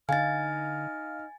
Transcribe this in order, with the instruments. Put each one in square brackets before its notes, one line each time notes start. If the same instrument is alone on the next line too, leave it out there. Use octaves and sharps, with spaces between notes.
[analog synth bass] D3 [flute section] D#4 D#5 F6 [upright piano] F5 [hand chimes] G#5 A6